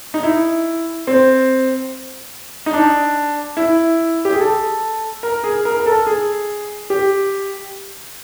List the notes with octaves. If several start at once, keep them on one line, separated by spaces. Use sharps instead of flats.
D#4
E4
C4
D#4
D4
E4
G4
G#4
A4
A#4
G#4
A#4
A#4
A4
G#4
G4